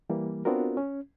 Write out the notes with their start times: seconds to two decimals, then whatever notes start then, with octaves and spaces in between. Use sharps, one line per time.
0.10 E3 G3 A#3
0.45 B3 C4 D4 F4 F#4 A#4
0.77 C#4